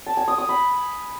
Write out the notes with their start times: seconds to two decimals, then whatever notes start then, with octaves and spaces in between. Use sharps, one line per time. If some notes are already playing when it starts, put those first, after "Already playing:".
0.07 A5
0.17 G#5
0.28 D#6
0.38 D#6
0.49 B5